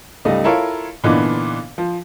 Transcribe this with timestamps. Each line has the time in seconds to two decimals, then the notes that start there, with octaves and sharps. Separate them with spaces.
0.25 C#2 G3 A3 D#4 D#5
0.44 E4 F4 A4 A#4 C#5 F5
1.04 A#2 D3 E3 B3 D4 D#4
1.78 F3